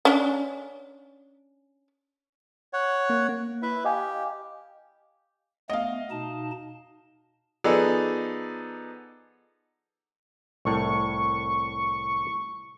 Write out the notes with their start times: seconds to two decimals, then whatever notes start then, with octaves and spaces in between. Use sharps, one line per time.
0.05 C#4 D4
2.73 C#5 F#5
3.10 A#3
3.29 A#3
3.62 E4 B4 E5
3.85 G4 D#5 F5 G#5
5.70 A3 B3 D#5 F5
6.11 B2 D#4 A5
7.64 F3 B3 D#4 G#4 A4 D5
10.65 C2 A2 C#6